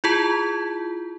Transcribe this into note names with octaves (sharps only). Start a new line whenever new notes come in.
E4 F4 G#4 A5